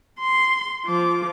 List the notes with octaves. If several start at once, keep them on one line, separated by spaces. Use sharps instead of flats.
C6
F3 D6